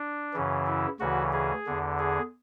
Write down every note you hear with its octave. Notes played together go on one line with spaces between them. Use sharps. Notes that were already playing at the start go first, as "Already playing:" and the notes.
Already playing: D4
F#2 C#3 E3
E4
D2 C#3 E3 F#4
G#4
E2 D3
G#4